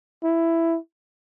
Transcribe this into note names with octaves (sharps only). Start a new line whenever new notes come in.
E4